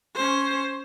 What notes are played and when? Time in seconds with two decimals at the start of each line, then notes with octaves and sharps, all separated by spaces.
0.15 C#4 C5